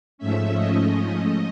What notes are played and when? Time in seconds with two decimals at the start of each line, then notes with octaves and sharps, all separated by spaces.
0.18 G#2 F3 A3 C#4 E5
0.54 D#5